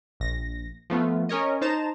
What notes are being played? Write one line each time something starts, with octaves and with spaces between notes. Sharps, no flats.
A#1 A#6
F3 A3 B3 F4
C#4 A#4 C#5 D#5
D#4 C5 A5 A#5 E7